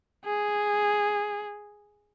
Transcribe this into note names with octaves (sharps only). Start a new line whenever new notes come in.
G#4